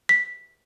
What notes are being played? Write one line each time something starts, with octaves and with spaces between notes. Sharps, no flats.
B6